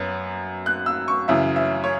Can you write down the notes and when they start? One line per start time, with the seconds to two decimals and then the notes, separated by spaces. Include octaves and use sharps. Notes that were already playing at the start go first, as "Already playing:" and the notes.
Already playing: F#2 F#3 B3
0.66 F#6
0.86 E6
1.08 C#6
1.28 F#2 C#3 E3 E5
1.56 E5
1.84 C#5